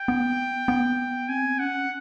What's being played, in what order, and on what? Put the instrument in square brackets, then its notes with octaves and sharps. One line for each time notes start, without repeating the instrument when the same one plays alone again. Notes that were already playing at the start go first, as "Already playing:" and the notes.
Already playing: [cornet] G5
[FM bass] B3
B3
[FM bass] C4 [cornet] G#5
[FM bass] C#4 [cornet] F#5